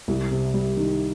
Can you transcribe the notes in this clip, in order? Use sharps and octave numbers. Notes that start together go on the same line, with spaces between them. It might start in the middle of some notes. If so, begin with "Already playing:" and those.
C2
C3
G3
D#3